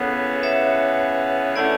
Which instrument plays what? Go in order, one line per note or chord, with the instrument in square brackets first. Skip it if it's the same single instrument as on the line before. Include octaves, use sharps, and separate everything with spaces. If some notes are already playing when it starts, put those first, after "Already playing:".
Already playing: [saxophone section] C#3 E3 B3 [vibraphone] A4 C#5
[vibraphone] C#5 E5
[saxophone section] D3 A3 C#4 E4 [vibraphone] D5 F#5